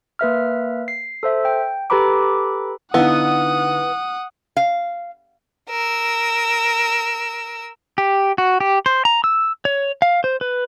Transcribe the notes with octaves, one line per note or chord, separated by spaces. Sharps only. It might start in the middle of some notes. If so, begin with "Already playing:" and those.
A#3 B4 E5 F6
C7
A4 C5 E5
G5
G4 A4 B4 A#5 B5 D6
D3 B3 D#4 E4 F5 F#5 D#6 E6
F5
A#4 E6
G4
F#4
G4
C5
A#5
E6
C#5
F5
C5
B4